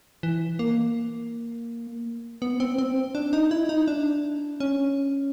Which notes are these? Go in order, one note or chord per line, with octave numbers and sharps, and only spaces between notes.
E3
A#3
B3
C4
C4
D4
D#4
E4
D#4
D4
C#4